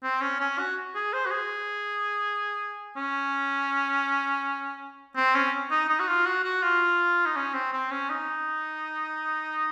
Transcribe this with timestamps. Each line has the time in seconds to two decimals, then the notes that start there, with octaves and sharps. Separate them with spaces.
0.03 C4
0.21 C#4
0.40 C#4
0.59 F#4
0.95 G#4
1.13 C5
1.26 F#4
1.31 G#4
2.97 C#4
5.16 C4
5.35 C#4
5.71 D#4
5.89 D#4
6.00 F#4
6.08 F4
6.26 F#4
6.44 F#4
6.63 F4
7.26 D#4
7.36 C#4
7.54 C4
7.73 C4
7.91 C#4
8.10 D#4